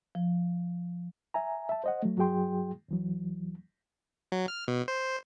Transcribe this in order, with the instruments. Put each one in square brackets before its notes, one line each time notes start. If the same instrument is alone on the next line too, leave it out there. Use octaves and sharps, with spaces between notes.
[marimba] F3
[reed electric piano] E5 G#5 A#5
E5 A5
C5 D#5 F#5
F#3 A3
G2 F#3 F#4 G#4 G5 C6
D#2 E3 F#3
[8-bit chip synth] F#3
F6
B2
C5